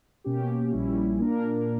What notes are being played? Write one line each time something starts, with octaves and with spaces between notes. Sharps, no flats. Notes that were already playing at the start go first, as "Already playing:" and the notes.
B2 A#3 C#4 G4
A#1 A#2 G3 C#4 E4
A#2 A#3 D4 A#4